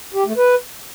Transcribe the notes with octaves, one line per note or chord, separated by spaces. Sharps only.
G4
A3
B4